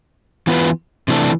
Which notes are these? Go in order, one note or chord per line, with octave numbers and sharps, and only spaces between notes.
E3 B3 F4 B4
C3 E3 A3 D4